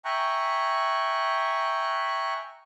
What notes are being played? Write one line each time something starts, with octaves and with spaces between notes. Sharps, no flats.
E5 G5 G#5 A#5 C#6 F#6